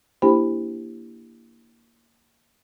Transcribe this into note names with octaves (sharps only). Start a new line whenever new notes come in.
A#3 D4 E4 G4 C5 B5